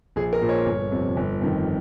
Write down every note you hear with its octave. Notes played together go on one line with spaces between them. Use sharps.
A#1 G#4
A#4
A#2 F3
C#5
G1
F2 C3
G1
F2 D#3